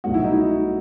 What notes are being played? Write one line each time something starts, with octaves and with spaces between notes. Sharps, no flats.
C2 B2 F#3 A3 F#4
E4
D#4
E4